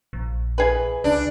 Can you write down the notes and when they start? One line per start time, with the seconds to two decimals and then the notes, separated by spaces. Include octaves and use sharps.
0.13 A#1
0.58 E3 G#4 B4
1.04 C#2 D4